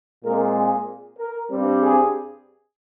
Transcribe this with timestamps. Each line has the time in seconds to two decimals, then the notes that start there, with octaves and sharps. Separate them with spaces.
0.24 A#2 G#3 C4 A#4
0.56 G#4
1.18 A#4
1.50 G2 G3 C4
1.82 G#4